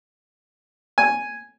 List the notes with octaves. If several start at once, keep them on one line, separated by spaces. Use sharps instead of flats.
G#5